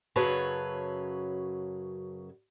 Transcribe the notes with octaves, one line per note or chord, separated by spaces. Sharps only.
F#2 C#3 F#3 B4 C#5 A5